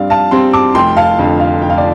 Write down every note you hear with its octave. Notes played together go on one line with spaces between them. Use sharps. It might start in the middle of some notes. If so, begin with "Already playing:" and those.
Already playing: G2 G3 C4 D5 F5
F5 A5
G3 C4 G5 C6
A5 D6
F1 G5 C6
F5 A5
F2 D3
F5
F1 G5
F5
D5